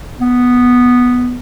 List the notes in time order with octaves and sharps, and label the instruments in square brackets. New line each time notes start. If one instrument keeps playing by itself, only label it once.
[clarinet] B3